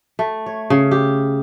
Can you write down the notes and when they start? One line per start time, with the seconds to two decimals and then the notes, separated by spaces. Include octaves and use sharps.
0.19 A3
0.46 C#5
0.70 C#3
0.91 G4